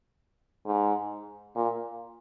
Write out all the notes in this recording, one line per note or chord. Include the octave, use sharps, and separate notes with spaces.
G#2
A#2